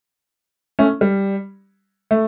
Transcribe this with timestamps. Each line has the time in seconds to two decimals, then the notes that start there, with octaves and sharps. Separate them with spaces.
0.79 A3 C#4
1.01 G3
2.11 A3